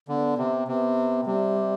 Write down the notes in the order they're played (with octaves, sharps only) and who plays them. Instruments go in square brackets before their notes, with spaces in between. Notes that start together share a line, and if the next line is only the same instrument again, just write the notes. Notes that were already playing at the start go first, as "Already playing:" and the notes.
[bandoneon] D3 [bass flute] B3
[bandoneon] C3
[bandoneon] C3 [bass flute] B3
[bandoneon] C3 [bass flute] G3